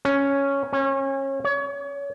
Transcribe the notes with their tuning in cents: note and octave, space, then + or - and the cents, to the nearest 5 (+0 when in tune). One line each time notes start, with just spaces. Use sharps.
C#4 +0
C#4 -30
C#5 +30